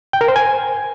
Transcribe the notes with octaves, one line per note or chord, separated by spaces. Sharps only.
G5
A#4
C5
G#5